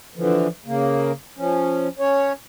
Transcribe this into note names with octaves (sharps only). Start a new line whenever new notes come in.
D3 E3 F3
C#3 A#3
F3 C#4
C#4 C#5